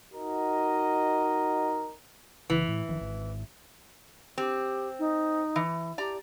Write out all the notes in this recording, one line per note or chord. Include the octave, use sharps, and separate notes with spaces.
D#4 F#4 A#4 D#5
F#1 C#3 E3
A2
F#1 D#3 F3
G#1
C4 G4
D#4
E3
G4 D5 A#5